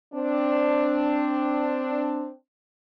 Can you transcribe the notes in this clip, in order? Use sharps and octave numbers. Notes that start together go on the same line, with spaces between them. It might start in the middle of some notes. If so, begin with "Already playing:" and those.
C4 D4